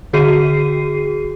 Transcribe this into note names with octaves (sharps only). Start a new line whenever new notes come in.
D3 F#4 G#4 C7 D#7